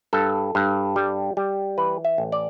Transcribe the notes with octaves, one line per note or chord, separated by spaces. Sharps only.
G2 A4
G2
G3
G3
E3 B4
E5
A1
D5